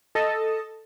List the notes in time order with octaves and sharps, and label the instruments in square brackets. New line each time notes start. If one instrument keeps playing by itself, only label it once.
[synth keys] A4 D#5 A5